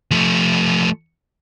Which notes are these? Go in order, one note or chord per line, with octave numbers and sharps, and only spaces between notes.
F3 A3